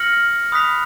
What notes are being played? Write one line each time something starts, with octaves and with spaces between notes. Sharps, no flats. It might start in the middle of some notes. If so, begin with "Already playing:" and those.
Already playing: F6 A#6 C#7 F#7
B5 D#6 F#6 B6 F7